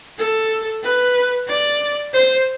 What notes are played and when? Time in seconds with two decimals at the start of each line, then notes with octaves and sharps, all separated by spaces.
0.19 A4
0.83 B4
1.48 D5
2.13 C5